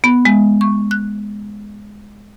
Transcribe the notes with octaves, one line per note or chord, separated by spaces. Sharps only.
B3
G#3
C#6
F#6